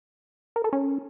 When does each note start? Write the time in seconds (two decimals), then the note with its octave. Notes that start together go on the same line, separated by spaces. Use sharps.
0.56 A#4
0.64 A4
0.73 C#4